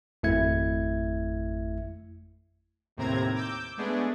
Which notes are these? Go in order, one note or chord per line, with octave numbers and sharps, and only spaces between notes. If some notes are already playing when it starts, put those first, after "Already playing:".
G#1 F2 A3 E4 E5 G#6
D#2 A2 C3 C4 A#5 G#6
D6 E6 G6
G#3 A3 B3 D4 G#4